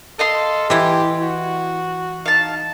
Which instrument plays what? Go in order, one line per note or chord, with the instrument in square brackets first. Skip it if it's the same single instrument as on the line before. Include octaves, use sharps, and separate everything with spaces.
[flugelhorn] A4 [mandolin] D#5 F5 C6
[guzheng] E3 E4 [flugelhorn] G4
[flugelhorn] F#4
[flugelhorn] D#4 [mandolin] F5 A5